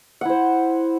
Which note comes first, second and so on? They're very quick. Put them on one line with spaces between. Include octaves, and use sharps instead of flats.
F#5 E4 C5